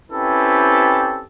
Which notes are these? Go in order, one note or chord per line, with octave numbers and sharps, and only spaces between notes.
C4 C#4 E4 G4 A4 B4